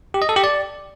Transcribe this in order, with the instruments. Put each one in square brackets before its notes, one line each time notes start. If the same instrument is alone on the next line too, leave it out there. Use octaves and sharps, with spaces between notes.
[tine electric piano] G4
D#5
A4
G4
D5